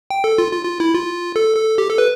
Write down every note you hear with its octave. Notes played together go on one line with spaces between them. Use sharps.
G5
A4
F4
F4
F4
E4
F4
A4
A4
G4
A4
B4